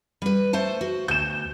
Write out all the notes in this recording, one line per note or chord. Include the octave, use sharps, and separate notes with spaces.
G3 B4
A3 C5 A5
F#4
D2 G6 E7